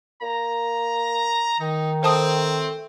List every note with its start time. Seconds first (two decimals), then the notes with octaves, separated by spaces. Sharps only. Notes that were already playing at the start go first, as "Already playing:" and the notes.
0.22 A#3 A#5
1.60 D#3 D#4
2.03 A3 C4 C5 A5 D#6